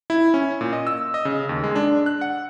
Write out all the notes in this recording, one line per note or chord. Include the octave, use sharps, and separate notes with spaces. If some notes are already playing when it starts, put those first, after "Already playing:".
E4
C#4
A#2
D#5
E6
D#5
C#3
D#2
G#3
D4
F#6
F#5